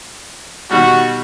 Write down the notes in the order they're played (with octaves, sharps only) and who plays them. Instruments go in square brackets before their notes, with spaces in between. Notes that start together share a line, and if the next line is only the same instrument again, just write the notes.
[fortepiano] B2 D#3 G3 [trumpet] F#4